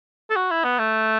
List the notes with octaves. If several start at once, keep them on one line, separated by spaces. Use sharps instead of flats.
A4
F#4
E4
B3
A3